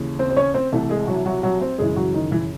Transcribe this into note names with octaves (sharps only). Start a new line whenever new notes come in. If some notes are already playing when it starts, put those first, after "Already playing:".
Already playing: D#2 C#3 E3
C4 C5
C5
C#4 C#5
C4 C5
C2 C3 E3 A3 A4
G#3 G#4
F#3 F#4
F#3 F#4
F#3 F#4
C4 C5
F#2 C#3 E3 G#3 G#4
F#3 F#4
D#3 D#4
E3 E4